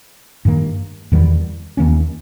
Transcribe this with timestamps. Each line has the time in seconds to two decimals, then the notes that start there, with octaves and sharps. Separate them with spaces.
0.45 G2 D#3 A#3
1.12 E2 D#3 G3 B3
1.77 D#2 D#3 A#3 C#4